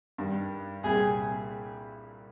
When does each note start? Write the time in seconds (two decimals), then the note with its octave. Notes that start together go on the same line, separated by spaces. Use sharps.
0.18 G2 D#3 G3
0.84 C2 A#2 G3 C4 G#4